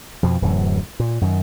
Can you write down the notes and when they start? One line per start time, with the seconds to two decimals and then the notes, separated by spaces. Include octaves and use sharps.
0.23 F2 B2 F3
0.42 D1 F#2 E3
1.00 A#2
1.21 F#2 D#3